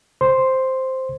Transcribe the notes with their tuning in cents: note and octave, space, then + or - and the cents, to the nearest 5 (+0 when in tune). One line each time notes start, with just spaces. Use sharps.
C5 +0 C6 +0